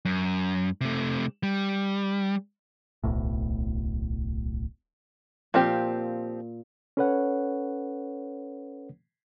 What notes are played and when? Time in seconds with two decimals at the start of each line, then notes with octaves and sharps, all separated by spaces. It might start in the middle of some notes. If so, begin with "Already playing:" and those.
0.05 F#2
0.81 C3 A3
1.43 G3
3.04 D1 B1 A2
5.54 A#2 F3 C4 G4
6.97 C#4 A4 B4 C#5 F#5